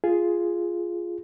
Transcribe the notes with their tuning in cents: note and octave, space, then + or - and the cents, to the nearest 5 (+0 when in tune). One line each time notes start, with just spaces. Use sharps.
F4 -5 G#4 +0